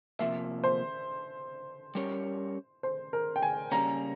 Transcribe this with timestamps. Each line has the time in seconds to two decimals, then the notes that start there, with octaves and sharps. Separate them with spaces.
0.19 C3 F3 A#3 E5
0.64 C5
1.95 G3 C#4 G4 A#4 C#5
2.83 C5
3.13 A#4
3.36 G5
3.42 G#5
3.72 C#3 G3 A#3 C#4 A#5